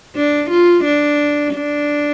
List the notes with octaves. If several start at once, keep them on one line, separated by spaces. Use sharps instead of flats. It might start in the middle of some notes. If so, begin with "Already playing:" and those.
D4
F4
D4
D4